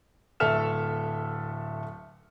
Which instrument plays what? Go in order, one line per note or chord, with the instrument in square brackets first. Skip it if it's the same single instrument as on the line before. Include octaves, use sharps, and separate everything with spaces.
[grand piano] D1 A3 A4 E5 F6 E7